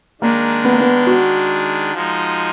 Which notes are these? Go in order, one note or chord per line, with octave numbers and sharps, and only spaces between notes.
D#3 G#3 A#3 D4
B3
A#3
B3
F#4
F3 G#3 D#4